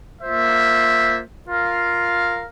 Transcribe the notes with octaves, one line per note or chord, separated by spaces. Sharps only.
A#3 F4 C5 E5
F4 A#4 F5